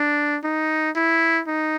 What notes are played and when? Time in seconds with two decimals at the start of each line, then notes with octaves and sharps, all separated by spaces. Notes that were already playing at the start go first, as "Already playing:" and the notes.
Already playing: D4
0.44 D#4
0.96 E4
1.47 D#4